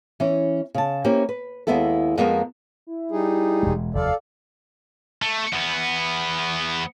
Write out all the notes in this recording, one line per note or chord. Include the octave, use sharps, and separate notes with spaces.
E3 C#4
C#3 A5
A#3 C#4 E4 G4 C5
B4
D#2 G#3 B3 E4 A4
F2 G#3 A#3 B3 A#4
E4
G3 D#4 G#4
E1 G#3
F1 D#2 A4 D5 F5
A3
E2 B3